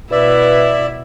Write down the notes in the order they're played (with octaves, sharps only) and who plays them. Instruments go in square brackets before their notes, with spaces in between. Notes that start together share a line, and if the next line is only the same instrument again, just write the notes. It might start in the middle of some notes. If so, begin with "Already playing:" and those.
[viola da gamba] B2 E4 [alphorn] B4 [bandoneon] D5 E5